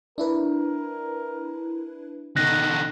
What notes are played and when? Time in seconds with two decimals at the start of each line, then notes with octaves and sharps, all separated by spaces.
0.18 D4 E4 A#4 B4
2.36 B2 D3 D#3 F#6 A#6